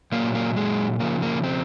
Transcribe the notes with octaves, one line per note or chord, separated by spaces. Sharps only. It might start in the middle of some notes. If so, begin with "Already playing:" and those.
A#2 F#3 A#3
A#3
G#3
C#3 F3 A#3
A#3
C4